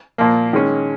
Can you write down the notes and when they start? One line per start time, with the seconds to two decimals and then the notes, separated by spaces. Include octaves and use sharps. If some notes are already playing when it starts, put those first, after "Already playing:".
0.18 A#2 F3 A#3
0.53 D#3 G#3 C#4